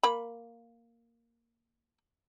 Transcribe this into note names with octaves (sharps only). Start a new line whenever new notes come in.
A#3 B5